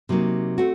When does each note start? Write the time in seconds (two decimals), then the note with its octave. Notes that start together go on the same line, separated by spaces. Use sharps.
0.09 C3 F#3 A#3 D#4
0.58 A3 C4 F#4